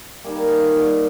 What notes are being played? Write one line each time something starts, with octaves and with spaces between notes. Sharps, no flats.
D#3 G3 A#3 G#5
A#5
G#5
F5
A#2 G3 A#3 D5
F5